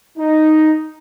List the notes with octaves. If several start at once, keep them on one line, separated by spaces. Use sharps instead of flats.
D#4